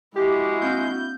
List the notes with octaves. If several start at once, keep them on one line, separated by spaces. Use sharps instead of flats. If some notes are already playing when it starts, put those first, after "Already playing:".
G#3 E4 F#4 G4
A#3 C4 D4 G6